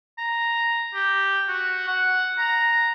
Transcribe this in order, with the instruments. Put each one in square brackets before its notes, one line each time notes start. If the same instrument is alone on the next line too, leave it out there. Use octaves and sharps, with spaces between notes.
[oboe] A#5
G4
F#4
F#5
A#5